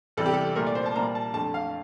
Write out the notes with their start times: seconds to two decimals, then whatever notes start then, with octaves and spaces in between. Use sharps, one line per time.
0.17 E2 C3 G3 A4
0.26 G4
0.34 A4
0.56 C2 A#2 A3 A#4
0.67 D5
0.75 C5
0.86 A5
0.95 A#2 G3 A#3 A#5
1.15 A5
1.34 F2 D3 A3 A5
1.54 F5